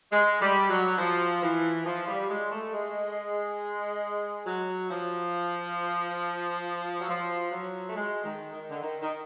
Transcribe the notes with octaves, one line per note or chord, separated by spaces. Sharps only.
G#3
G3
F#3
F3
E3
F3
G3
G#3
A3
G#3
F#3
F3
F#3
F3
F#3
A3
G#3
D#3
D#3
D3
D#3
D#3